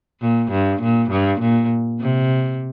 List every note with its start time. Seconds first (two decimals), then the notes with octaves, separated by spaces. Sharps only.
0.21 A#2
0.51 G2
0.82 A#2
1.10 G2
1.40 A#2
2.00 C3